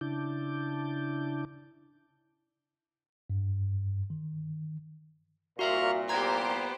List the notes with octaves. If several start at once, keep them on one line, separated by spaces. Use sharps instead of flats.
C#3 D4 E4 A5 D6 G6
G2
D#3
C2 A#2 F#4 A#4 E5 F5 C#6 F6
B3 G4 C5 A#5 G#6